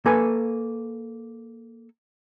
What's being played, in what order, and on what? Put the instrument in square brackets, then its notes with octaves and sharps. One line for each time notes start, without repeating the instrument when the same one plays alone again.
[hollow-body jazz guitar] A#3 A4 B4 G#5